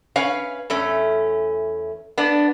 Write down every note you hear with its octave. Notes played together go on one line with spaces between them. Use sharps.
C#4 B4 C#5 F5
E2 A3 C#4
B3 D4